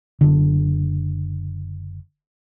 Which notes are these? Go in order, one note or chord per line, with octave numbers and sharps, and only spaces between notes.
F#1 D3